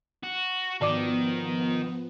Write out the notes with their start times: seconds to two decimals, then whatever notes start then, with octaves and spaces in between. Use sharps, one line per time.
0.23 F#4
0.81 G#2 D#3 F3 B3 D5 D6